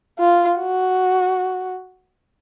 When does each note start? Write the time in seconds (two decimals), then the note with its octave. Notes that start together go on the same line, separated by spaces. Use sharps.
0.19 F4
0.58 F#4